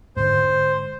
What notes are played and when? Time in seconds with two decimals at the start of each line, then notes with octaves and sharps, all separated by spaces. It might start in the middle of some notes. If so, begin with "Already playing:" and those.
0.17 G#2 D3 C5